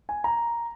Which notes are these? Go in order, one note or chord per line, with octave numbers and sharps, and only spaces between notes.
G#5
A#5